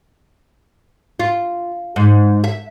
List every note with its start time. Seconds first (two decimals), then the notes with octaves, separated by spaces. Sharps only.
1.20 F4
1.96 G#2
2.44 E5